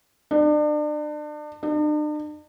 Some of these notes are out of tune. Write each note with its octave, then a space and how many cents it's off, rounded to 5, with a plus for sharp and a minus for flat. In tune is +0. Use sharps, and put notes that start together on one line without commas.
D4 +35
D4 +45